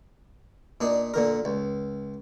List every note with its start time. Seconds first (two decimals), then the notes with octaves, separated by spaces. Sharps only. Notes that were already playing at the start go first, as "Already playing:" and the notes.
0.81 A#2 D4 D#4
1.14 A#2 D3 A#4
1.45 C#2